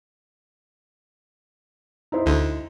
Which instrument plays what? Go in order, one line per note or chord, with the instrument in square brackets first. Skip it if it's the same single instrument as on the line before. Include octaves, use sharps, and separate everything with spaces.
[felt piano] D#4 E4 C5
[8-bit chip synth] D2 D3